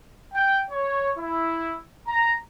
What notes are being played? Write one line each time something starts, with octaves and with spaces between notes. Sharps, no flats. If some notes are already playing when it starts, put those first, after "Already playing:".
G5
C#5
E4
A#5